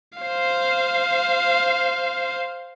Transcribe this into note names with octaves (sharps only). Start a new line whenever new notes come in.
C5 F5